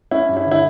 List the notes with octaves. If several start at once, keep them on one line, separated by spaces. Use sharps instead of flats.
C#4 E4
G2
E4
D3
E4